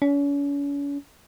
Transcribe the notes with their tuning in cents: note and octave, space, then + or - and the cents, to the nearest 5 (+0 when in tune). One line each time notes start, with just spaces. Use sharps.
C#4 +40